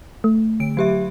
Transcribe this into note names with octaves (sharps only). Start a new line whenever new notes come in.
A3
D3 D7
F#3 G4 E5